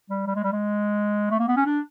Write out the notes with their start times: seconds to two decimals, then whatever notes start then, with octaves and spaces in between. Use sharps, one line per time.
0.10 G3
0.27 G3
0.35 G#3
0.44 G3
0.53 G#3
1.31 A3
1.39 A#3
1.48 B3
1.56 C#4
1.66 D4